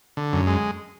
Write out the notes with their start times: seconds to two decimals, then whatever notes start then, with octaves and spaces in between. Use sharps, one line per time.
0.17 D3
0.33 F#2
0.47 G#3